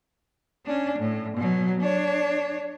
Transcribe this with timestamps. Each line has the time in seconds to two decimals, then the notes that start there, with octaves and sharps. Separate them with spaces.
0.66 C#4 D4
0.99 A2
1.37 B2 F#3
1.81 D4 C#5